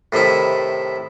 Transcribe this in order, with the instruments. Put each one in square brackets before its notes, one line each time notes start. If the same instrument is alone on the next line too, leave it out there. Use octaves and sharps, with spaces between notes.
[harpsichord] A2 C3 D#3 E4